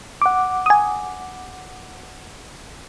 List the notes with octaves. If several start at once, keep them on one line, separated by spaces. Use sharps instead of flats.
F#5 D6
G#5 D#6